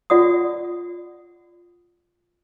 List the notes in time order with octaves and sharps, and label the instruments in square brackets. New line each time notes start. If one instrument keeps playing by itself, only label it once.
[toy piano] F4 D5 F#5 D#6